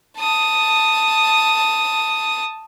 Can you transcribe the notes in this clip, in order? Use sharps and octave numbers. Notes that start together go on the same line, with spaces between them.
A5 D#6